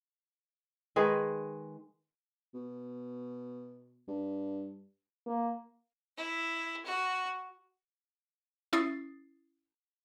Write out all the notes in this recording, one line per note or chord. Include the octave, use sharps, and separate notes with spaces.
D#3 G#3 G#4 B4
B2
G2
A#3
E4
F#4
C#4 E4 D#6 A6 C7